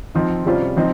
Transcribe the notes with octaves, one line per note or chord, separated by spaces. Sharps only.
F3 C4 D#4
C3 G3 C#4 F4 C5
F3 C4 D#4